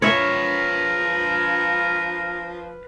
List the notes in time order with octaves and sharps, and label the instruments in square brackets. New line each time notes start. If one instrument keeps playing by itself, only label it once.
[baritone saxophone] F3 [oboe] A#4 [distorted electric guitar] B4 F5 [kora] C#5 E5